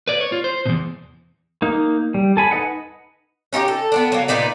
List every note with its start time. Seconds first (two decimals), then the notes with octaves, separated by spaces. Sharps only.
0.08 B4 D5
0.21 C#5
0.32 F4
0.44 C5
0.65 E2 B2
1.62 A#3 D#4
2.14 G3
2.37 A4 G#5 B5
2.51 D#4 B4 D#5 F#5
3.53 C#4 D#4 F4 G4
3.68 A4
3.92 B3 C4 D4
4.12 F#3 A#3
4.28 A#2 D#4 B4 D5